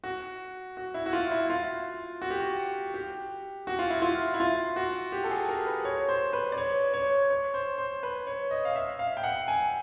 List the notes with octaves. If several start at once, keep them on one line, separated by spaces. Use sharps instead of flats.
F#4
F#4
E4
F#4
F4
E4
F4
F#4
G4
F#4
G4
F#4
F4
E4
F4
E4
F4
F#4
G4
A4
G#4
A#4
B4
C#5
C5
B4
D5
C#5
C#5
C#5
C5
C5
B4
C#5
D#5
F5
E5
F5
G5
F#5
G#5